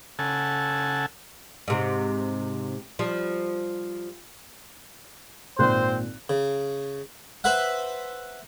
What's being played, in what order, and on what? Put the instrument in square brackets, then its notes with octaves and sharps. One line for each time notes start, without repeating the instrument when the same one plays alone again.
[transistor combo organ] C#3 A4 F#5 G#5 A5 E6
[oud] G#2 C3
F3 G3
[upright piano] G#1 A#2 F#6 [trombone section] C4 C5
[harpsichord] C#3
B4 C5 E5 F#5